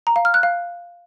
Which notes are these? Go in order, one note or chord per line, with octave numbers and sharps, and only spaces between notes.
A#5
F5
F6
F#6
F5